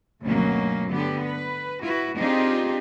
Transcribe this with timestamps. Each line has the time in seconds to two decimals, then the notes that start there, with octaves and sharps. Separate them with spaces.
0.22 D2 G2 B2 F#3 A#3 C#4
0.90 D3 B3 G4
1.25 B4
1.82 E4 F#4 B4
2.17 C4 D4 D#4 F4 G4 G#4